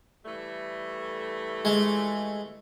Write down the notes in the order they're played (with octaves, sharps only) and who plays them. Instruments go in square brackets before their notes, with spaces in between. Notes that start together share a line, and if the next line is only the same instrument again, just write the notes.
[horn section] E3 G3 A3
[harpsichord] G#3